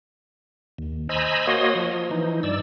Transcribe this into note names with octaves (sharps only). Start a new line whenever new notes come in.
D#2
C5 D#5 G#5 A#5 B5 E6
A#3 F#4 C#5 D#5 C6 D#6
F3
E3 D#4
G2 D5 E6